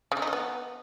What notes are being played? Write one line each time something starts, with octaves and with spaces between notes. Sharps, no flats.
C#3
D3
D#4
F3
B3